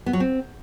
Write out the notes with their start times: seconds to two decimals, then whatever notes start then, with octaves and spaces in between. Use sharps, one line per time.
0.06 B3
0.13 F#3
0.20 C4